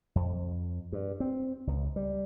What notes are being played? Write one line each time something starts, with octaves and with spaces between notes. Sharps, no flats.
F2
G2
C4
C#2
G3